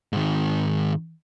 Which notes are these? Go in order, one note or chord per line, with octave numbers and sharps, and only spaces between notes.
G#2 D#3